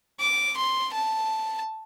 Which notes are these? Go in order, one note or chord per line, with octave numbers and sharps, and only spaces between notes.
D6
C6
A5